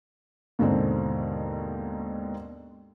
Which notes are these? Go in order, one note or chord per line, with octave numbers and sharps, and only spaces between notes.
D#2 G#2 B2 D3 C4